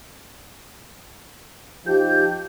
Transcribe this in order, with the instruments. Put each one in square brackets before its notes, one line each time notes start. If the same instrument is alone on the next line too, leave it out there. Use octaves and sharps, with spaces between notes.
[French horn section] F3 D#4 G4 [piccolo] G6